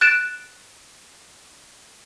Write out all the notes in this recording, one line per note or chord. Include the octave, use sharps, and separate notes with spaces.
F#6 A6 D7 E7